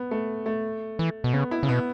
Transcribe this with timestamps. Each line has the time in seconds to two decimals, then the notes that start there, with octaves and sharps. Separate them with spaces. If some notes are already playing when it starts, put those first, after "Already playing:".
Already playing: B3
0.11 A3
0.46 A3
0.99 E3
1.24 B2
1.33 C#3 B3
1.51 E4
1.63 C#3
1.69 B2 B3